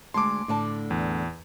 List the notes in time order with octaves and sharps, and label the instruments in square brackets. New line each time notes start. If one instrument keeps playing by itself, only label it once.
[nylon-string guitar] D2 G#3 A5 [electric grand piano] C6 D6
[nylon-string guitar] A2 D3 A5
[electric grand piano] E2